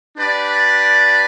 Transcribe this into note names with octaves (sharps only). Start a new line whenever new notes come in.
D4 G4 B4 D5